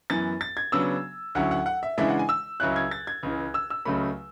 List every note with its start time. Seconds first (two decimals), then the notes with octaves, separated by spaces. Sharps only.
0.10 F#2 E3 B3 A6
0.41 A6
0.57 G#6
0.72 C#3 F#3 B3 D4 E6
1.35 D2 D3 F#3 C#4 E4 F#5
1.51 F#5
1.66 F#5
1.83 E5
1.98 C#3 E3 G#3 D4 E5
2.09 F#5
2.19 G#5
2.29 E6
2.60 C#2 C#3 F#3 C#4 E4 F#6
2.76 G#6
2.91 A6
3.07 G#6
3.23 C#2 C#3 E3
3.54 E6
3.70 E6
3.85 C#2 C#3 F#3 A3 B5